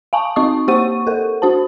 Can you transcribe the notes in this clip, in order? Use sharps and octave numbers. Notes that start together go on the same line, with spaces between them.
F5 G#5 A5 C#6
C4 D#4 D#5 C#6 D#6
A#3 G4 C5 F#5 C#6 D#7
A4 A#4 F#5
D4 F#4 C5 A5